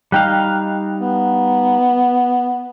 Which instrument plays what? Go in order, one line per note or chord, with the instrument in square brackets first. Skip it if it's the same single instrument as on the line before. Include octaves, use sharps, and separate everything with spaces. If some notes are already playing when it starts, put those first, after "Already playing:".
[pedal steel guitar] G3 D#4 F5 [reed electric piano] G5 F#6
[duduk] B3